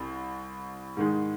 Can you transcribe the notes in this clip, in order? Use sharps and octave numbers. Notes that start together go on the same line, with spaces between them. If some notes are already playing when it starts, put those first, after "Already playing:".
Already playing: C2 C4
G#2 D#3 G#3